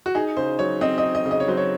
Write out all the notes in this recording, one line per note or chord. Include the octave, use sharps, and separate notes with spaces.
F#4
D#4 G#4
C#3 C5
F#3 C#5
C4 D#5
D#5
D#4
D#5
C#3
D#5
C#5
F#3 C5
C#5